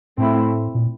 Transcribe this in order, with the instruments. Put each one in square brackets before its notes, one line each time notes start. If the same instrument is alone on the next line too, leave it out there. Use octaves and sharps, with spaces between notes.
[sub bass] A2 [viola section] A3 C4 E4
[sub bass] A#2